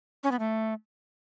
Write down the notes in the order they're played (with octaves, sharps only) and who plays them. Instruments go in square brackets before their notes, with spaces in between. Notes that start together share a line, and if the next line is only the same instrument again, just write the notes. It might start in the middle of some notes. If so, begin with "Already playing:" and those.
[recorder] C#4
B3
A3